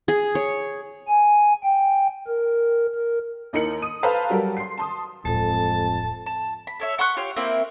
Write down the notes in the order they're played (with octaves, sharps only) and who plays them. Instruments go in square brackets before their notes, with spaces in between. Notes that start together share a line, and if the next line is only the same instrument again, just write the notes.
[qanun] G#4
C#5
[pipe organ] G#5
G5
A#4
A#4
[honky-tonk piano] D#2 D#4 E4 A#4 C#7 F#7
D#6 D#7
A4 B4 C5 F5 A5 A#5
F#3 G3 F#4 A4 A#4
C6 C7
A5 C6 D#6
[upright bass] D1 [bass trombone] F2 [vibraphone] G#3 A4 [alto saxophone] A5
[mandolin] A5
B5
A4 C#5 E5
F#5 C6 C#6 F#6
F4 G4 C#5 C6
A#3 C4 E4